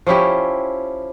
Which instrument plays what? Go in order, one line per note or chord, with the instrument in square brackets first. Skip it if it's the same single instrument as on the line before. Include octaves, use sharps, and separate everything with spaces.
[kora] F3 C#4 E4 G4